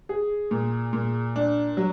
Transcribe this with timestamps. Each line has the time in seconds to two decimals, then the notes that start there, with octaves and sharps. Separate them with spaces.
0.09 G#4
0.51 A#2
0.93 A#2
1.36 D4
1.77 F#3